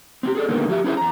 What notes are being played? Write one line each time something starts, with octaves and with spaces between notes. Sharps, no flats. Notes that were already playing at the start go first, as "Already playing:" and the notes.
C4 D#4 G4
G#4 A4 D5
A#2 D3 D#3 G#3 A#3 B3
F3 F#4 G4 E5
C#4 E4 G#4 C5 E5
E2 A#5